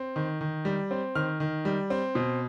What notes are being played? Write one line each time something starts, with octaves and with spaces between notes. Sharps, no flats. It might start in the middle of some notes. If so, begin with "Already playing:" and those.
Already playing: C4
D#3
D#3
G3
C4
D#3 F6
D#3
G3
C4
B2